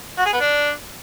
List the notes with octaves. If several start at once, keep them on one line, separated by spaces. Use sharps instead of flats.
F#4
G#4
B3
D4